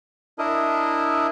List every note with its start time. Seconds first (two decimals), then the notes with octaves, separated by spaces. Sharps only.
0.39 D4 E4 A#4 D#5